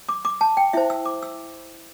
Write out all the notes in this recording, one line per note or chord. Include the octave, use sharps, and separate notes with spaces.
D6
D6
A5
G5
E4 C5 E5
E6
D6
E6